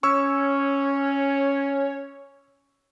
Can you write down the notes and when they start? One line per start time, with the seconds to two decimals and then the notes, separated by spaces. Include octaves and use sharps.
0.03 C#4 C#5 C#6 E6